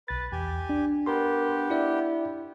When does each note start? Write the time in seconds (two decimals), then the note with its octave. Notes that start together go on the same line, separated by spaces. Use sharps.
0.08 B1 B4 A6
0.32 E2 G4 G#5
0.69 D4
1.06 B3 G4 A#4 C6
1.70 E4 D5 E5